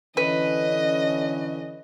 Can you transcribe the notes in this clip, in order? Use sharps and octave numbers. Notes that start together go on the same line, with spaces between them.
D3 E3 C#4 B4 D#5